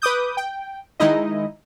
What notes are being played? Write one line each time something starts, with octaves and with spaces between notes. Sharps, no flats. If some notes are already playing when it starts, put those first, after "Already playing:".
B4 D6 D#6 G6
G5
D#3 G#3 D#4 E4 D#5